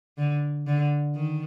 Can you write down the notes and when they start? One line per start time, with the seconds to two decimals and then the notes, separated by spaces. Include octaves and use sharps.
0.18 D3
0.67 D3
1.15 D#3